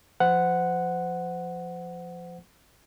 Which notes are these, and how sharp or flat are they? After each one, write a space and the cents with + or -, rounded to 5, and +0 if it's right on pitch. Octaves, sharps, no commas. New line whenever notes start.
F3 +0 C5 -30 F#5 +0